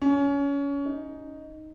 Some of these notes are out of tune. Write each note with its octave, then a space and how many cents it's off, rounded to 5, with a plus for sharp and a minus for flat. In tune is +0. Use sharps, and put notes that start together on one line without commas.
C#4 +25
D#4 +0